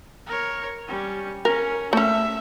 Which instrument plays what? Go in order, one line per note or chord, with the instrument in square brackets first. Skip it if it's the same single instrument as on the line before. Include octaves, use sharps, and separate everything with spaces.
[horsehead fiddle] A#4 C#5
G3 C#4
[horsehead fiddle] C#4 [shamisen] A#4
[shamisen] A3 C#4 [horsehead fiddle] E5